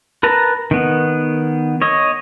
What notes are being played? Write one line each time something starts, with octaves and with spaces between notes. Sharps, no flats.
A#4 B4 A5 A#5
D#3 B3
C#5 D#5